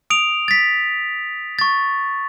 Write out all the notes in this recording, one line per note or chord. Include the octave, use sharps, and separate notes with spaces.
D#6 D7 F7
A6 B6
C#6 A6